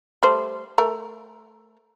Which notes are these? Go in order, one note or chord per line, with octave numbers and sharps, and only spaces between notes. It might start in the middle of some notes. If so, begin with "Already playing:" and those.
G3 A3 C5
A3 A#4